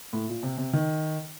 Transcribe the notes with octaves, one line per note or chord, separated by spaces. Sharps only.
A2
A#2
C3
C3
D#3